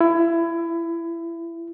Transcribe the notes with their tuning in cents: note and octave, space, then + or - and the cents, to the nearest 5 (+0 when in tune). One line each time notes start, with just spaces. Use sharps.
E4 +25